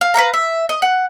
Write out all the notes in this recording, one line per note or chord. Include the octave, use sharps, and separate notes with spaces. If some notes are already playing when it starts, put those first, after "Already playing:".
F5
B4 C#5 F5 A#5
E5
D#5
F#5